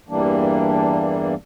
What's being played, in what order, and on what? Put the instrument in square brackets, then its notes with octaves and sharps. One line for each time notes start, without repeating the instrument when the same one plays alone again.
[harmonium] E2 G2 E3 G3 A#3 D4